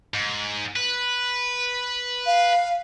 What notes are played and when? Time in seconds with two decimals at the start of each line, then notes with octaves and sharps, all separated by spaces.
0.14 G#2
0.76 B4
2.26 F5